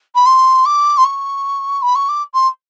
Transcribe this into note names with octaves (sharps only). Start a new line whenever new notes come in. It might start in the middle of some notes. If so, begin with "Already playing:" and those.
B5
C6
D6
C6
C#6
B5
C#6
D6
C6